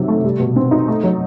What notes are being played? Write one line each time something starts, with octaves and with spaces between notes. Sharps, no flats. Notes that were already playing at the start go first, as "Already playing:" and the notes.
Already playing: C3 D#3 F#3
A3
G3
B2
C4
D#4
A3
F#3